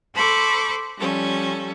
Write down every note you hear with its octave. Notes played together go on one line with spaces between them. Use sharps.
A4 C5 B5 C#6 D6
F3 G3 C#4 A4